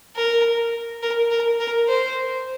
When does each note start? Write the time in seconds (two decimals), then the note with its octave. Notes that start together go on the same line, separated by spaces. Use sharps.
0.15 A#4
1.02 A#4
1.30 A#4
1.60 A#4
1.87 C5